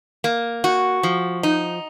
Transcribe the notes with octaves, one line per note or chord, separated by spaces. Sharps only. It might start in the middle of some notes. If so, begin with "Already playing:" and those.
A#3
F#4
F3
D#4